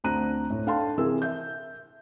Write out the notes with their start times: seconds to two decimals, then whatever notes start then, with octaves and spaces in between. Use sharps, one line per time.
0.04 D2 C4 D4 A#5 F#6 D#7
0.50 A2
0.66 D4 A4 F5 G5 A5 C6
0.98 C3 E3 G#4 A#4 E6
1.22 E5 G6